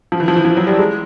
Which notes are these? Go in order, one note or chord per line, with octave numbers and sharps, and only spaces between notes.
F3
E3
F3
E3
F3
F#3
G3
G#3